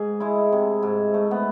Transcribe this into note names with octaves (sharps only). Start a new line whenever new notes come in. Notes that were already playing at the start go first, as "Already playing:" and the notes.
Already playing: G#2 G#4
G#3 E4
C3
G#2
A3
B3